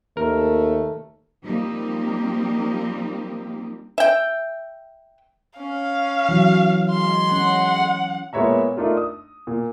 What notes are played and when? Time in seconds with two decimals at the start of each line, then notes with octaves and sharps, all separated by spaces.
0.17 D#2 A3 A#4
1.44 F3 G3 A#3 C4 D#4 G4
3.98 E5 G5
5.59 C#4 F5
6.29 E3 F#3
6.91 G#3 C6
7.32 C#4 F#5
8.33 A#2 G#3 B3 C#5 E5 A#5
8.77 A3 D4 D#4 F4 A#4
8.97 D#6
9.47 A#2